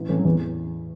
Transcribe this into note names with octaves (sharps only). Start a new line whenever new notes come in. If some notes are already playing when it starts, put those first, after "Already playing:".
Already playing: A1
A2 E3 A3 C#4
F#3
E2 E3